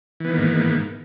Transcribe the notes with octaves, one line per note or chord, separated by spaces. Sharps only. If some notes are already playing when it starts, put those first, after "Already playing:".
G#2 D#3 E3 A#3 B3